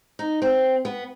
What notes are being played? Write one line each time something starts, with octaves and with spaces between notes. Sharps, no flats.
D#4
C4
B3